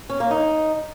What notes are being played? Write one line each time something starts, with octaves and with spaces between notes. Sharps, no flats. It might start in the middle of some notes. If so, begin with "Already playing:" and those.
C#4
A#3
D#4